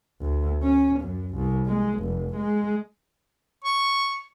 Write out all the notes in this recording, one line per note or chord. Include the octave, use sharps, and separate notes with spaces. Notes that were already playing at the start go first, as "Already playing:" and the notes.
D2
C#4
F#2
C2
G#3
F1
G#3
C#6